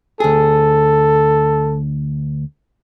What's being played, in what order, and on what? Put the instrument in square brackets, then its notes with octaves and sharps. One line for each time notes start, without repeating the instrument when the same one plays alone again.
[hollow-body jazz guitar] D2 G#4 [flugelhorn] A4